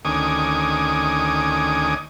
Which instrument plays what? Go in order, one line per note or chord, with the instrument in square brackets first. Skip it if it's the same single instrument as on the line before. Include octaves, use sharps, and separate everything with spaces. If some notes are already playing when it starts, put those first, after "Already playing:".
[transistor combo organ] D2 D#3 C#4 G#5 D6 D#6